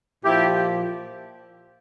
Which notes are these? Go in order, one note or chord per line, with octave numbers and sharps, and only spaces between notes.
A#2 F3 E4 G4